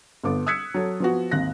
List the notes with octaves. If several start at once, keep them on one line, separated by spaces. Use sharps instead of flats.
G1 B3 A4 D6
D#6 E6 F#6 G#6 B6 C#7
F#3 A4
F3 B3 F#4
G#1 D#2 F#6 A#6